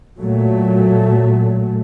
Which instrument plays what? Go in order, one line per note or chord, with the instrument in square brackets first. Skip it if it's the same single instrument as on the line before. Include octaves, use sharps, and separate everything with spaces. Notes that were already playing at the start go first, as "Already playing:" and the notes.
[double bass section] A#2 F#3 A3